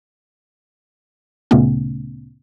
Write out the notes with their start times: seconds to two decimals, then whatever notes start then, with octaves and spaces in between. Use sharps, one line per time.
1.51 D2 A#2 C#3 A3 B3 C#4